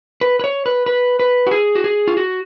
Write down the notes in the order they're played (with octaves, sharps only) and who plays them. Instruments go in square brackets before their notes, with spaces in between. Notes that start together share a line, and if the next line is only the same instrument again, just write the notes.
[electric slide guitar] B4
B4
C#5
B4
B4
B4
F#4
G#4
F#4
G#4
F4
F#4